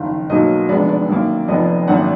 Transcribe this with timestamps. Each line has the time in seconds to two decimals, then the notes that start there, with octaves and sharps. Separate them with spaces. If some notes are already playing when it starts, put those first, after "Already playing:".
Already playing: F#1 F2 D#3 F5
0.30 B1 B2 F#3 A#3 D#5
0.69 F1 F2 D3 G#3 B3 D5
0.89 D5
1.09 F#2 D#3 A#3
1.48 F1 F2 F3 B3 D#5
1.61 D5
1.87 G#1 F#2 D#3 A#3 F#5